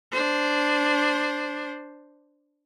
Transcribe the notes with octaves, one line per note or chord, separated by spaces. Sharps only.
D4 C5